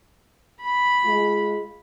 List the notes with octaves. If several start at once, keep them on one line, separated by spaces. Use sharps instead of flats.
B5
G#3 F4